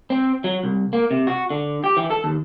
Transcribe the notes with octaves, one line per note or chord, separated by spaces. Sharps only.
C4
F#3
C2
A#3
C3
F#4
D3
G4
E3
A4
D#2